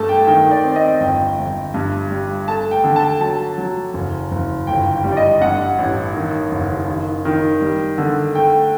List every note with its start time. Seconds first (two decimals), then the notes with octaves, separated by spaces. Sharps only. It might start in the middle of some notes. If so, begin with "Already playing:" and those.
Already playing: G2 A3 A5
0.09 G5
0.27 D#3 G5
0.51 D5
0.64 C4
0.76 D#5
1.00 G1 G5
1.38 G1
1.74 G2
2.11 G3
2.48 A3 A5
2.71 G5
2.84 D3
2.96 A5
3.21 F#3 A5
3.58 F#3
3.94 F#1
4.32 F#1
4.67 G1 G5
4.92 G5
5.04 G3
5.12 D5
5.17 D#5
5.41 G2 F#5
5.78 A1
6.14 D#3
6.52 F#1
6.88 D#3
7.25 D#3
7.61 G3
7.98 D3
8.35 A3 G5